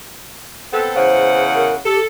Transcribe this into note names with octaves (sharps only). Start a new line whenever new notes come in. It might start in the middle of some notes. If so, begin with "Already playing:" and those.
B3 C4 A4
E2 C#3 C5 F#5
A#4
G4 A4